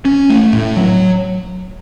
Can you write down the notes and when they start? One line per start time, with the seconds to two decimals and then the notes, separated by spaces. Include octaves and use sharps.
0.05 C#4
0.30 A3
0.53 A2
0.77 F#3